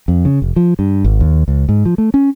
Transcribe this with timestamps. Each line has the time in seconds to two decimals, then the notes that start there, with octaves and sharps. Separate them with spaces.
0.08 F2
0.25 C#3
0.42 F1
0.56 F3
0.79 G2
1.04 G#1
1.20 D#2
1.48 C#2
1.69 G#2
1.85 F3
1.98 A3
2.14 C#4